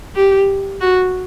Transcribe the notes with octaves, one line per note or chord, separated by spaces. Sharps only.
G4
F#4